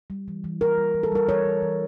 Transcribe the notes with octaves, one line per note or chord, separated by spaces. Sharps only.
G3
E3
E3
G3 A#4
G3
E3
A4
G3 A#4
E3 C#5
E3
E3